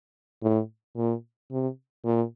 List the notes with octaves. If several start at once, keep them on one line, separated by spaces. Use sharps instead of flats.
A2
A#2
C3
A#2